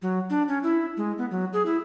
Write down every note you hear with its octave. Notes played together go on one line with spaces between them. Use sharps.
F#3
D4
C#4
E4
G#3
B3
F#3
G#4
E4